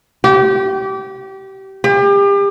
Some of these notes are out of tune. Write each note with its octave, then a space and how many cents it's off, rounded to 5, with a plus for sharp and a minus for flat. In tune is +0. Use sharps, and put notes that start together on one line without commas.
G4 -25
G4 +35